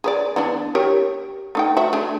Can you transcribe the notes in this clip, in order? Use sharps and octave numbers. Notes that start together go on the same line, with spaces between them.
G#4 B4 D5
E3 B3 D4
G4 A#4 C#5
A3 D#4 G5
F#4 E5
A3 D4 G#4